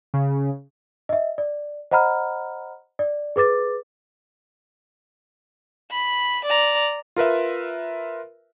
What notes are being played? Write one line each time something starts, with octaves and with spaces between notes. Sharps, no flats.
C#3
D#5 E5
D5
C5 D#5 F#5 A#5 B5 F6
D5
G#4 B4 D6 A6
B5
D5 A#5
F4 A#4 B4 E5